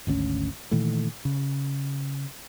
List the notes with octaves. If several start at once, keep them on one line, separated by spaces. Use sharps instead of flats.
G#1 D2 C4 C#4
A#2 D#3 E3 A3
C#3